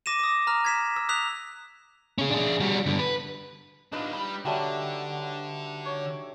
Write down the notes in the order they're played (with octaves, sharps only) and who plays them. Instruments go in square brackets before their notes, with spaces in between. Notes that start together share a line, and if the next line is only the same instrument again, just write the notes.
[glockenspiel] D6 A#6 D#7 E7
D6 D#6
A#5 F6
G#6 B6 E7
E6
D#6 F#6 B6 F7
[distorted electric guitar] C#4 G#4
D4 G#4
G3 F#4
G2 D3
B4
[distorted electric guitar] D4 F4 [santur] D#4 B4 D#5
[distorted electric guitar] G3 B5
[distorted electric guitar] D3 [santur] F#3 G3 A3
[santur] C#5